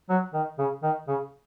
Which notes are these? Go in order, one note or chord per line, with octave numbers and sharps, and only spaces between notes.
F#3
D#3
C#3
D#3
C#3